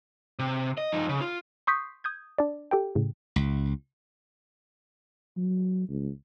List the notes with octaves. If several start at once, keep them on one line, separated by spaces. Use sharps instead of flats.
C3
D#5
F3 D#4
C#3
F4
C6 C#6 D#6 G6 B6 C7
D#6 G6 G#6
D4 D5
G4 A4 G5
A2 C#3
C#2
F#3
C#2